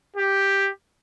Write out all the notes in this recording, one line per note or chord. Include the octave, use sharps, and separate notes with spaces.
G4